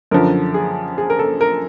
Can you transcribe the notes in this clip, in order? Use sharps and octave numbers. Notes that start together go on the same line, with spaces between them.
F#2 D3 F3 A#4
G#4
G#4
A#4
A4
A#4